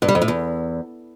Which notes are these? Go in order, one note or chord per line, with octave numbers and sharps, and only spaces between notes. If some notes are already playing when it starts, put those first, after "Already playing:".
G2
G3
F2
A2
E2